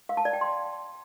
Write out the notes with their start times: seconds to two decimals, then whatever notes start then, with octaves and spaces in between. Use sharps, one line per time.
0.09 F5
0.17 A5
0.25 D5
0.33 G5
0.41 C6